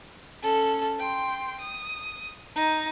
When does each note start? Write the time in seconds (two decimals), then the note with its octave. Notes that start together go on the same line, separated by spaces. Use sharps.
0.42 C#4 A4
0.99 G5 C6
1.59 D#6
2.56 D#4